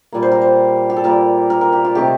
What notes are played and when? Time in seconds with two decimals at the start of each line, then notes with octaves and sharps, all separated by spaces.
0.13 A#2 G3 A#3
0.22 C5
0.32 A#4
0.42 C5
0.90 G4
0.96 A4
1.04 A#2 G3 A#3 A#4
1.50 A#4
1.61 A#4
1.72 G4
1.85 F4
1.95 C3 D#3 A3 G4